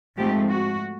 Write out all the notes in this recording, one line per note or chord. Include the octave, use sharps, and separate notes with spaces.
G#2 F3 A3 C4 G4
F#4